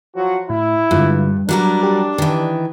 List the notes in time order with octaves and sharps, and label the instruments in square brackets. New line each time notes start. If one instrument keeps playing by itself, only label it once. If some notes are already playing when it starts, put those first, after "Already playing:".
[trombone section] F3 F#3 F#4
[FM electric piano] A2 [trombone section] E4
[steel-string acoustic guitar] G2 [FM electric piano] D3 G#3 F4
[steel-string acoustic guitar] F#3 G3 A#4 [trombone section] D4 [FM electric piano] F#6
[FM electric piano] G4
[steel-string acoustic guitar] D#3 E3